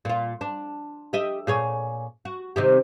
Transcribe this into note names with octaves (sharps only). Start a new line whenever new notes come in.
A#2 F4
D4
G4 D#5 E5
A#2 G#4 C#5
F#4
C3 D#3 G4